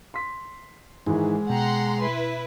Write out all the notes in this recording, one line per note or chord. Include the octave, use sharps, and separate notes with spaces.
C6 B6
G#2 D#3 E3 G#3
B2 F#5 G5 A#5 C6
E4 B4